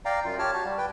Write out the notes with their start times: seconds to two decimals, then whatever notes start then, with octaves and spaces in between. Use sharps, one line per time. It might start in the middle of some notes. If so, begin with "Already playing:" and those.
0.05 D5 F5 G5 A#5
0.25 F#2 F4
0.39 G4 C#5 A5 F6
0.54 F#4 A5
0.65 G3
0.78 B4 G5